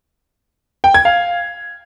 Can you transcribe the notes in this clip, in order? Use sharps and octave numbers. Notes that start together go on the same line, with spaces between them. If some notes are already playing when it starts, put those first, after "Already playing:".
G5
G#6
F5